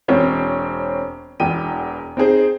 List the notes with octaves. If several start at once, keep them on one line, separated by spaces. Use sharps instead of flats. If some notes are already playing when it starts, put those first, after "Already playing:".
E1 C4 C5 C#5
E1 E2 G5 D#7
C4 D#4 G#4 C5